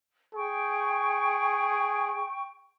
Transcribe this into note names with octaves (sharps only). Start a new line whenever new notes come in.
G#4 G5 C#6